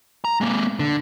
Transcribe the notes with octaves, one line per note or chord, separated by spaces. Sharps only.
A#5
G#3 A#3
D3